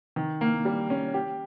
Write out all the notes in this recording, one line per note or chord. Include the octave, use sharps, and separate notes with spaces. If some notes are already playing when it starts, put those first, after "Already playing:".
D#3
A#3
G3
C#4
G4